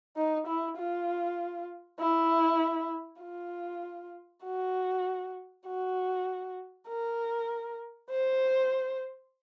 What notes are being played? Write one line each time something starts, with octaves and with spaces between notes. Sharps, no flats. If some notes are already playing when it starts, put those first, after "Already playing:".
D#4
E4
F4
E4
F4
F#4
F#4
A#4
C5